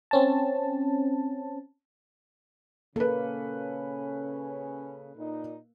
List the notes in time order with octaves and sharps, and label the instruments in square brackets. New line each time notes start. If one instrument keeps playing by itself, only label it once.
[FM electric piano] C4 C#4 A5
[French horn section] C#3 C#4 [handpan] A#3 [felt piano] A4 B4
[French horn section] A#2 D#4